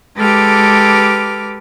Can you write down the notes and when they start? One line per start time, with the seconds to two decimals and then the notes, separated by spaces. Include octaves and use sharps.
0.17 G#3 G4 A4 B4 D6 F6